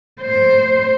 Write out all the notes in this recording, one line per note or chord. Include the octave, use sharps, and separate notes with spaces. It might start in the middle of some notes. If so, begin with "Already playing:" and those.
C5